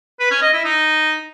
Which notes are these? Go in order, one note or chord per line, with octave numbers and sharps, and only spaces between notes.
B4
C#4
D#5
E4
D#4